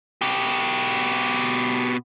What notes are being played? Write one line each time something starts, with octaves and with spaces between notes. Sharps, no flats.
B2 G4